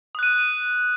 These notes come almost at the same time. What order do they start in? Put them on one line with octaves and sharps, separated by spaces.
D#6 F#6 D#7